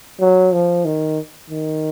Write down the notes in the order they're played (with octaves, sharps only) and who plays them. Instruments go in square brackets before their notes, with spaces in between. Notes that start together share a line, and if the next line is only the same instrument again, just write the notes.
[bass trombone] F#3
F3
D#3
D#3